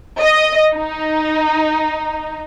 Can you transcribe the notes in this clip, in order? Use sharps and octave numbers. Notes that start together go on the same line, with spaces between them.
D#5
D#4